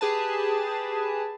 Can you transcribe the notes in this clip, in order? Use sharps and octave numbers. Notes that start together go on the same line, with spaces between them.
G4 G#4 B4 A5